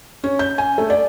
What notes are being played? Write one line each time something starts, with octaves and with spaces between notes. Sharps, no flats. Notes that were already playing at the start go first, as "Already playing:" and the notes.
C#4
G6
G#5
A3
D5